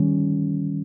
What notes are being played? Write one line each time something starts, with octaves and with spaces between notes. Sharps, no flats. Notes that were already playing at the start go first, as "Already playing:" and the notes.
Already playing: D#3 G3 C#4